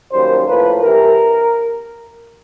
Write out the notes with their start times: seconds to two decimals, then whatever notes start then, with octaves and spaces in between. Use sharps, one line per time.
0.12 F#2 D#3 G3 A#3 C5
0.46 A2 F3 A#3 B4
0.81 C2 C3 E3 A#4